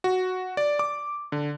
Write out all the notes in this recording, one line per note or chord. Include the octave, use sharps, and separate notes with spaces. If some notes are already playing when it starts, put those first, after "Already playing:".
F#4
D5
D6
D3